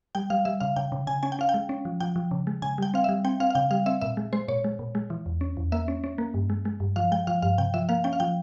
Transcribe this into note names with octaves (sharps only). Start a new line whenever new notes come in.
G3 G5
G3 F5
G3 E5
C#3 F5
C#3 G5
C#3
C#3 G#5
C#4 G#5
G5
C#4 F5
G5
G#3
C#4
F3
F3 G5
F3
C#3
G#3
C#3 G#5
G3 G5
C4 F5
G3 E5
C4 G5
C4 F5
F5
C#3 G5
G3 F5
C4 E5
A#2 E5
G#3
G#3 C5
A#2 C#5
G#3
A#2
G#3
E3
E2
C#4
E2
A#3 E5
C#4
C#4
A#3
G2
G#3
G#3
G2
F3 F5
G#3 G5
F3 F5
G2 F5
C3 G5
F3 E5
A#3 F5
C#4 G5
F5
F3 G5